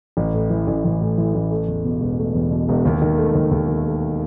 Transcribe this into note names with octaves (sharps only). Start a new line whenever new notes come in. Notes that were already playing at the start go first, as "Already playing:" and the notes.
A1
A2
E3
A1
A1
A2
E3
A1
A3
E2
B2
E1
A3
E2
B2
E1
D#2
D#3
A3
D#2
D#2
D#3
A3